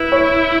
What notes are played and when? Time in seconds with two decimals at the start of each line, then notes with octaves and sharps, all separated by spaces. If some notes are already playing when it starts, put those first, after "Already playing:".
Already playing: E4 B4
0.12 C#5